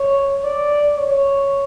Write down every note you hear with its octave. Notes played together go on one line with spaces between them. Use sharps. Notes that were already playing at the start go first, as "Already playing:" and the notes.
Already playing: C#5
D5
C#5